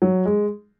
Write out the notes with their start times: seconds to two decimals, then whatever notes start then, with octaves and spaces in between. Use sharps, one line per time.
0.02 F#3
0.25 G#3